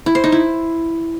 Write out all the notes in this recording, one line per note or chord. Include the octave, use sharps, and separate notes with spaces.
E4
C5
D#4
E4